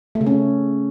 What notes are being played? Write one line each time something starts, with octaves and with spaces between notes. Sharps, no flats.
A3
C#3
C#4